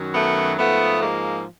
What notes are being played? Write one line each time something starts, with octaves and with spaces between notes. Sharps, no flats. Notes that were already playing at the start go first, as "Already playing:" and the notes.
Already playing: F#2 D#3 F#3
A3 B3
G#2 F3 A3 B3
G#3 A#3